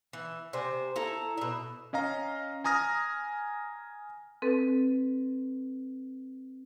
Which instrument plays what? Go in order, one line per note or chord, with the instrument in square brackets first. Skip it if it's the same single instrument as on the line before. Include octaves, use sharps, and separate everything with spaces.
[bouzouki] E3
C3 C5 G#5
E4 A4 A#5
B2 E5
[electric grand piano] C#4 D#5 F5 A#5
G#5 A#5 D#6 F6 A#6
[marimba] C4 A4 B4